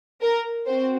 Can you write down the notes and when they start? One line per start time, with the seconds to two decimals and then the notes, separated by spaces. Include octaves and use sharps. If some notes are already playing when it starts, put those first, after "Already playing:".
0.21 A#4
0.67 C4 F#4 C5